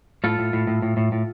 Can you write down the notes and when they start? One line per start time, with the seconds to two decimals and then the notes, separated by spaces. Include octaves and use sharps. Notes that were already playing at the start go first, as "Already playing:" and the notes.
0.24 A2 F4 A4
0.39 A2
0.53 A2
0.67 A2
0.82 A2
0.97 A2
1.12 A2